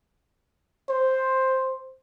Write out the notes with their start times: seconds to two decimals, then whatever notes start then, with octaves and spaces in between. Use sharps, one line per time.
0.89 C5